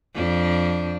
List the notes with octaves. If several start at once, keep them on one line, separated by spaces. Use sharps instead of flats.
F2 D4